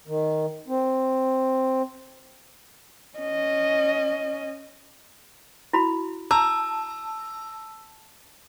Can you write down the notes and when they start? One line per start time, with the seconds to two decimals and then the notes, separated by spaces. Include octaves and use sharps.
0.07 D#3
0.68 C4
3.18 C#4 D#5
5.73 E4 F#4 B5
6.31 A5 A#5 E6